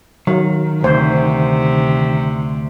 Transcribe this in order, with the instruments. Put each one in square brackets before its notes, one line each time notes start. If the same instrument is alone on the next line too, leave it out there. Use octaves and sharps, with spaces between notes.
[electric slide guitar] D#3 [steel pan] F#3
[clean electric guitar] D2 [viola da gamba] C3 [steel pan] C5